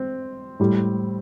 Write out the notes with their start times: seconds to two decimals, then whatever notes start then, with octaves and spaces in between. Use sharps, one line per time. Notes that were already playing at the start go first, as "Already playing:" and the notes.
Already playing: C4
0.60 A2 G3